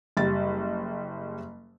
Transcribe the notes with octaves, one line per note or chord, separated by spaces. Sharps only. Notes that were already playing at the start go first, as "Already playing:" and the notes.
F#1 G3 A6